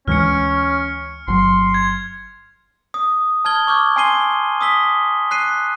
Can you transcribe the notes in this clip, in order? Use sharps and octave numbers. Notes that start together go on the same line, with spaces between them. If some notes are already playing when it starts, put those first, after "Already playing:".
D2 E3 G#3 C#4 F6 C#7
G1 F#3 C6
G#6
D#6
A5 F6 G#6 G7
C#6 D6 F6 G6
G#5 C6 C7 D#7 G7
D#6 E6 B6 G7
F#6 C7 D#7